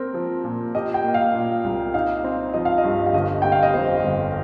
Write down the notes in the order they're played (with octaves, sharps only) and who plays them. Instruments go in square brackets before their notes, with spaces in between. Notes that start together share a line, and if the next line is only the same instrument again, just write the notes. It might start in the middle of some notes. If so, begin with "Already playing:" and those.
Already playing: [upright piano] C4 G4 [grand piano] A#4
[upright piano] F3
A#2
[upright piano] G4 [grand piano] D#5
[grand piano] G5
[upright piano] A#3
[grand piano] F5
[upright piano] A#2
C2
[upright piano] D#4 [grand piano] F5
[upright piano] C4
[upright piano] F3 [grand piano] D#5
[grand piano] F5
D#5
[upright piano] G2
[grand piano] F5
[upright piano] G1 [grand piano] D#5
[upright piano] C3 [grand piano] G5
[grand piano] F5
D#5
[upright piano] F2 [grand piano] C5
[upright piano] G1